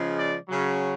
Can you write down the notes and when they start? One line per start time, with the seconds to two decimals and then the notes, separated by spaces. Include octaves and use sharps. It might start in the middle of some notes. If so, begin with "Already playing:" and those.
Already playing: C#3 F3 G#3
0.18 D5
0.48 C#3 F#3